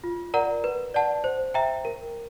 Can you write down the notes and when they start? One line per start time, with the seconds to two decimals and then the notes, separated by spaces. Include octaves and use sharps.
0.04 F4
0.34 A#4 D5 F#5 A#5
0.64 B4
0.94 D5 F#5 A5
1.24 C5
1.54 E5 G5 A#5
1.85 A#4